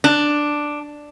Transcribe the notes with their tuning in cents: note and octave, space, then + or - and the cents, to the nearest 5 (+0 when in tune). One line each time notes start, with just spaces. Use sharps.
D4 +5